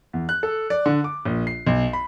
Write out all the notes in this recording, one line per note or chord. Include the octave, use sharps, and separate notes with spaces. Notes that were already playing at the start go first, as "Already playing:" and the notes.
E2
F#6
A4
D5
D3
D6
A#1
C7
B1
B5